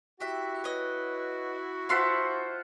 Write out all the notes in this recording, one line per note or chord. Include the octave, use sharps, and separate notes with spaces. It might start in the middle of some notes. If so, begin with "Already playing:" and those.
E4 F#4 G4 E5
B4 C#5 D#5
F4 B4 C5 E5 F#5 A5 C6